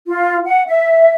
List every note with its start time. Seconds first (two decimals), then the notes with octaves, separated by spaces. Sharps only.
0.06 F4
0.46 F#5
0.67 E5